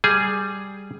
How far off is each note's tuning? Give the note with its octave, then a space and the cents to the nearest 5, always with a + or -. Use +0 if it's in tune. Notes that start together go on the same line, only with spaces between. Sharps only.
G3 +0 G#4 +0 G#5 +15